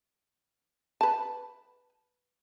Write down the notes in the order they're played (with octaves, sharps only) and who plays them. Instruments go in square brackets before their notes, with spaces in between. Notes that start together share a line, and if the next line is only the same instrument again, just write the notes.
[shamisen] B4 A5